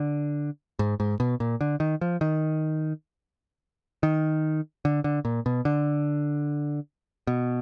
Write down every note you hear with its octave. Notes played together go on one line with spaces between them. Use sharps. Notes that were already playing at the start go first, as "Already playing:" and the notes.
Already playing: D3
G#2
G#2
B2
A#2
D3
D#3
F3
D#3
D#3
D3
D3
A#2
B2
D3
B2